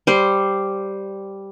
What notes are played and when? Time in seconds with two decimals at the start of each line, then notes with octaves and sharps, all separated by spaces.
0.07 G3 C5